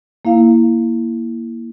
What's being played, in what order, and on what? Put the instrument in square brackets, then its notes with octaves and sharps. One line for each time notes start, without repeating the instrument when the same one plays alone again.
[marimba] A#3 E4 F5